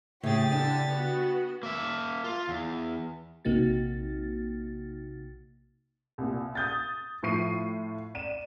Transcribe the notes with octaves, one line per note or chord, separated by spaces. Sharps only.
A2 C#3 G4 G#4 A6
D3 D4
B3 F#4
A#3 E5
F4
E2
A#1 C3 A#3 D#4 F#4 A6
C2 A#2
D#6 G6 A6
A2 F3 C#6 C7 D#7
D5 D#7 E7